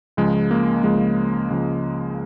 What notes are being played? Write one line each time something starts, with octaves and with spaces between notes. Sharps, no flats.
C#2 C#3 F3 G#3
A#3
C#2 C#3 F3 G#3
C#2 C#3 F3